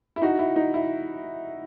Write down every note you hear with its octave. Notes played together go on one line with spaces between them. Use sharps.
E4
D#4 F#4
E4
D#4
E4